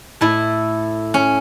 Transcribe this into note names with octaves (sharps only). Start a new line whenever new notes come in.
A2 A3 E4
C#4